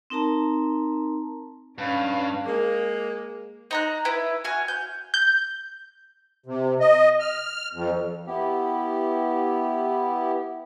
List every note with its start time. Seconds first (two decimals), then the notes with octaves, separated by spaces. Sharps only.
0.10 C4 D#4 A#4 A5 A#5
1.78 G2 C#4 F5
2.45 G#3 A#3
3.71 D#4 A#5 F#6
4.05 E4 B4
4.44 F#4 G#5 F6
4.68 G6
5.14 G6
6.46 C3
6.80 D#5
7.20 F6
7.73 F2
8.27 B3 E4 G4